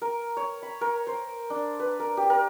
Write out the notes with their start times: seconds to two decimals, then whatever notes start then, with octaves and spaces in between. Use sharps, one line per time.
0.02 A#4
0.37 C#5
0.62 B5
0.81 A#4
1.07 C5
1.50 D4
1.80 B4
2.00 A#4
2.17 G4
2.30 A#4